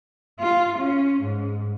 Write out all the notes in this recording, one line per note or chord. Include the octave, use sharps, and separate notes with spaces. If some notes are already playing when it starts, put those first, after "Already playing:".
F4
C#4
G#2